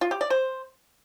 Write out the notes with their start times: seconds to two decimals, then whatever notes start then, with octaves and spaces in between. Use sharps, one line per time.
0.01 F4
0.11 G4
0.21 D5
0.30 C5